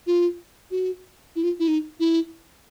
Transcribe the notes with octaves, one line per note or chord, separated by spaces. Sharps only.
F4
F#4
E4
F4
E4
D#4
E4